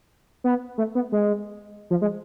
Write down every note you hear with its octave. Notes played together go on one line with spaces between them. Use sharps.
B3
A3
B3
G#3
F3
G#3